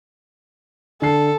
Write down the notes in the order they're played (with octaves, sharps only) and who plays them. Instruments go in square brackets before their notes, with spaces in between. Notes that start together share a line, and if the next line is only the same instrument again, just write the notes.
[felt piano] D3 C7 [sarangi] A4